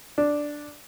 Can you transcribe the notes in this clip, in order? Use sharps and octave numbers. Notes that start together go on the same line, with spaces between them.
D4